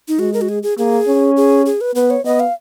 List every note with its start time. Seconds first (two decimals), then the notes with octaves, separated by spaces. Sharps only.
0.08 D#4
0.19 G#3 F#4
0.33 A#4
0.41 F#4
0.49 G#4
0.63 G#4
0.78 A#3 G#4
1.08 C#4
1.37 G#4
1.66 G#4
1.81 B4
1.95 B3 B4
2.10 C#5
2.25 B3 D#5
2.40 F5